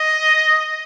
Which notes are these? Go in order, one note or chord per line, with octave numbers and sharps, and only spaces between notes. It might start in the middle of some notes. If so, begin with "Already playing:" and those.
Already playing: D#5